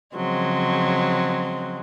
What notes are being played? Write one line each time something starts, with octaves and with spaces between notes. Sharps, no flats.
C#3 F3 F#3 G#3 C4